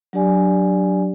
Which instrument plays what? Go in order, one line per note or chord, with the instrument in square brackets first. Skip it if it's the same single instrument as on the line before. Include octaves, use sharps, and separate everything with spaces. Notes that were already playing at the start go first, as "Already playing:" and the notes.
[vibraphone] F#3 D4 G4 D5 G#5